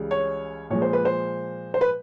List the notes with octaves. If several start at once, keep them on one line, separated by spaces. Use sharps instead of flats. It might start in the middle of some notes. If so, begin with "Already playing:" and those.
Already playing: C#2 C#3 E3 G3
C#5
A#2 F3 G#3 C#5
C5
B4
C5
C5
B4